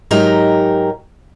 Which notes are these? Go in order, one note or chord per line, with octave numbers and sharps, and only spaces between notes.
G#2 F#3 D#4 G4 A#4